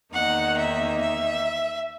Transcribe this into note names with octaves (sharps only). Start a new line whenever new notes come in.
E2 D#3 A#3 D#4 F#5
E5
E5